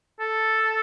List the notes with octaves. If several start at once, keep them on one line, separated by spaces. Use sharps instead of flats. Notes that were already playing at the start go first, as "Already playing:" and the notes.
A4